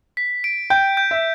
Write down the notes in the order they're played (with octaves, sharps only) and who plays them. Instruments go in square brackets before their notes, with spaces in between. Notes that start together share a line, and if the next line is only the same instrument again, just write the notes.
[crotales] B6
D7
[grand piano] G5 [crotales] G6
[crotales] G6
[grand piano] E5